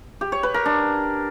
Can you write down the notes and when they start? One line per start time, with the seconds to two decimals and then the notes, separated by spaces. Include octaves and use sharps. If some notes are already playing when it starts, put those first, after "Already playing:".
0.21 G4
0.32 C#5
0.43 B4
0.54 A#4
0.65 D4